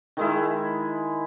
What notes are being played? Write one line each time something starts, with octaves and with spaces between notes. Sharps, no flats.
D#3 G#3 E4